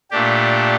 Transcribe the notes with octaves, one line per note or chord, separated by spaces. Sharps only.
A#2 A3 D4 G4